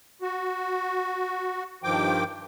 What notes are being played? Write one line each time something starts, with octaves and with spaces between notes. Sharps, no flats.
F#4
G2 D#3 F3 G5 D6